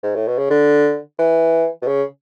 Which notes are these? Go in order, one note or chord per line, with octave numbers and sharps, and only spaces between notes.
G#2
A2
B2
C#3
D3
E3
B2
C#3